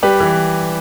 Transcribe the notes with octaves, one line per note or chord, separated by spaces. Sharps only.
G3 G4 B4
E3